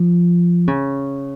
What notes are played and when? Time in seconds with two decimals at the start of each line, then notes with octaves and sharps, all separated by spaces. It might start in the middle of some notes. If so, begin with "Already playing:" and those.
Already playing: F3
0.67 C#3